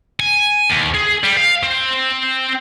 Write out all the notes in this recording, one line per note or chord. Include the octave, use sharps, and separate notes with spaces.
G#5
D#2
G#4
G3
F5
C4